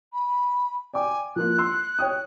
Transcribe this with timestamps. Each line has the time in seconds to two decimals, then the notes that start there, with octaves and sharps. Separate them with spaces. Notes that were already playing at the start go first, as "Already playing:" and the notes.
0.13 B5
0.94 D5 G5 G#5 D6
1.36 F3 A#3 F4 F#6
1.58 C6 E6
1.99 C#5 G5 D#6